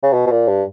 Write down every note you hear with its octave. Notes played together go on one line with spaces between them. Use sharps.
C#3
B2
B2
A#2
G2